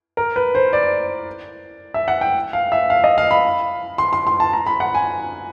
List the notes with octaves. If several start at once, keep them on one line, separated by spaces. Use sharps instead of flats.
A#4
B4
C5
D5
E5
F#5
G5
F5
E5
F5
D#5
F5
B5
C6
C6
C6
A5
A#5
B5
F#5
G#5